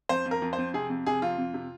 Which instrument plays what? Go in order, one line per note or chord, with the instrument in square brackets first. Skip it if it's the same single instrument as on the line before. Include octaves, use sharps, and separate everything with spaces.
[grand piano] F2 C5
F2
A#4
F2
C5
F2
C3 G#4
F2
C3 G#4
F2 F4
F2
C3